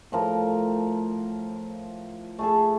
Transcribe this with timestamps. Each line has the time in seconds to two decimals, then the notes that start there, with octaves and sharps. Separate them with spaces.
0.12 A2 F3 A#4
2.39 A3 G#4 A4